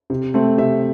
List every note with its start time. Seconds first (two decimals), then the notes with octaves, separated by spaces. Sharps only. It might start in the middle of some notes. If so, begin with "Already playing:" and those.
0.10 C3
0.34 A3 C4
0.58 C3 E5